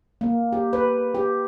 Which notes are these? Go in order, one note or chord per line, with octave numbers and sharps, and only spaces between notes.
A#3
G4
B4
G4